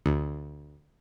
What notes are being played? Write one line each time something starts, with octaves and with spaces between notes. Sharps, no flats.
D2